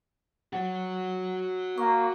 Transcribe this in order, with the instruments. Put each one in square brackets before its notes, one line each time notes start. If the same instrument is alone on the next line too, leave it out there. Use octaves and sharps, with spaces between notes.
[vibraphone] F#3 [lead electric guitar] F#4 C#5
[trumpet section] A#3 [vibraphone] C#6